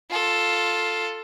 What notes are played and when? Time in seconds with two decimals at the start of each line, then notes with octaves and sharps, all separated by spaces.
0.10 F4 A4